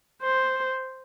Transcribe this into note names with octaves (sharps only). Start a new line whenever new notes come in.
C5